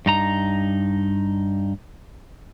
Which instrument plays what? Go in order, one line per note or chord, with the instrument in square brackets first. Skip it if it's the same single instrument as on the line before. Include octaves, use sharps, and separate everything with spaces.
[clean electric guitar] G2 D#4 A#5